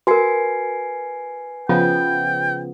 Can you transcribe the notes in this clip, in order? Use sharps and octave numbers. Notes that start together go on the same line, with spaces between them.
F#4 A#4 B4 G#5 C7
C#3 F3 B3 F4 G5